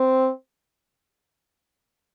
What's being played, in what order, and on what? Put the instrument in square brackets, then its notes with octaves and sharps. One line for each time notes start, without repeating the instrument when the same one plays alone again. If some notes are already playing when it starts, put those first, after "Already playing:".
Already playing: [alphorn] C4